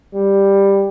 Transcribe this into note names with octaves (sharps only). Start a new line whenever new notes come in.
G3